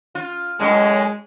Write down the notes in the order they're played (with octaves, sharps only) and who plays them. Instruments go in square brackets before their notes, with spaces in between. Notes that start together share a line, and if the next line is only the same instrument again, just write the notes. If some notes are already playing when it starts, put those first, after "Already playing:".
[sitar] F4
[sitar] F#2 A2 [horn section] G#3